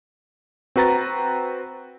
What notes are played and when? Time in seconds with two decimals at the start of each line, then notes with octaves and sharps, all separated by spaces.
0.76 C4 F#4 B4 A#5 A6